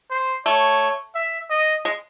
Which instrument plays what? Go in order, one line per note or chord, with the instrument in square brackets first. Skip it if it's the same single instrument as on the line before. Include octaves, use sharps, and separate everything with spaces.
[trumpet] C5
[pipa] A3 [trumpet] C#5
[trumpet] E5
D#5
[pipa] G#3